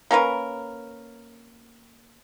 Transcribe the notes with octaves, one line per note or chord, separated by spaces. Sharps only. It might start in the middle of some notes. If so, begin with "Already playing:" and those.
A#3 C#4 A#4 B4